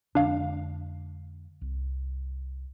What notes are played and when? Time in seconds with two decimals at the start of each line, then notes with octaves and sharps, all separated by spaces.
0.15 F2 D3 G#3 D4 F5
1.61 C2